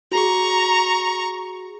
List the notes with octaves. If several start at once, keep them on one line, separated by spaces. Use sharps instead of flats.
F#4 G#4 A#5 C#6